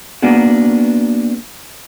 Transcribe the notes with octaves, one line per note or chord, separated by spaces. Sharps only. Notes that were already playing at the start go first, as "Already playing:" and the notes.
A#3 B3 D4 F#4 G#4